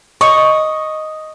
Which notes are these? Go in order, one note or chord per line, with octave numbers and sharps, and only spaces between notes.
D#5 C#6